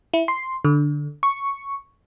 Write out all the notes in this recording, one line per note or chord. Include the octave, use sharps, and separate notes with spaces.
E4
C6
D3
C#6